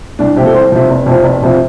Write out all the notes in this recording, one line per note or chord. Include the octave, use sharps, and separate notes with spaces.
C2 D4
C3 F3 G4 A4
C2 C5
C3 F3
F1
F2 C3 F3
F1
F2 C3 F3